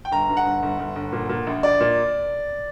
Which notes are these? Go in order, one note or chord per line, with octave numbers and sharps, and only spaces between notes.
G5
G1 A#5
G2
F#5
G1
G1
G1
G1
A#2
A#2
A#1
A#1 D5
A#2